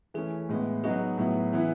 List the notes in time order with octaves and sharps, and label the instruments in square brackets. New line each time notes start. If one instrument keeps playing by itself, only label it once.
[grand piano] E3 A3 C#4 [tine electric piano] G#4
[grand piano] A2 G#3 B3 E4
[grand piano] F#3 B3 D#4 F#4 [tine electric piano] G#4
[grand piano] A2 F#3 B3 E4 [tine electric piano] G#4
[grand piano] E3 B3 E4